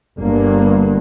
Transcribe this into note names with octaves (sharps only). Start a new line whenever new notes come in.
G1 G2 A#3